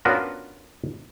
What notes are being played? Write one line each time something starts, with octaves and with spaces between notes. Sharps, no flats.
B3 C#4 D4 F4 F#4 A#4